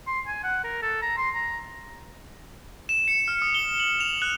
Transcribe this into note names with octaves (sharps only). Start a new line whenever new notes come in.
C6
G#5
F#5
A#4
A4
A#5
C6
A#5
E7
C#7
F6
D#6
G7
F#7
F7
F#6